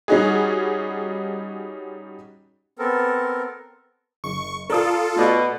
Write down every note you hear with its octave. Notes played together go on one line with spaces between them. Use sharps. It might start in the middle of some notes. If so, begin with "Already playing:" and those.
G3 C#4 D#4 F#4 G#4
B3 C4 A4 A#4
F#1 C#6
F4 A4 A#4 D5 D#6
B2 A3 D5